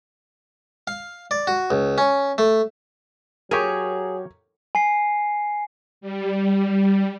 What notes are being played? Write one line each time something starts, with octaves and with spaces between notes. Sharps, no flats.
F5
D5
F#4
C#2
C#4
A3
F#3 G4 G#4 A#4 C#5 G#5
G#5 C7
G3